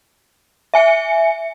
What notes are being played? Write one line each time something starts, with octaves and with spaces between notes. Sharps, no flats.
E5 G#5 C#7